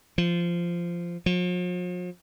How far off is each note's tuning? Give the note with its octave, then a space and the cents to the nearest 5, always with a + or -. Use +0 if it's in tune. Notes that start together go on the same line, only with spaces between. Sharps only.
F3 -15
F3 +45